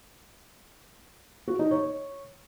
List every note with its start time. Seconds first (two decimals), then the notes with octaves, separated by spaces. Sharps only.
1.48 F#4
1.59 D#4
1.71 C#5